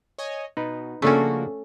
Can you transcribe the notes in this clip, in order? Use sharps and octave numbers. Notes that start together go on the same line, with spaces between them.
C#5 D#5 G#5
B2 D#4 B4
C#3 F3 A3 A#3 C#4 D4 F#4 A4